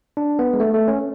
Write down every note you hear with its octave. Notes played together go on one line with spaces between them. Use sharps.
D4
B3
G#3
A3
A3
C#4